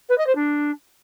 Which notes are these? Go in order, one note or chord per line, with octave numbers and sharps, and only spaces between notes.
B4
D#5
C5
D4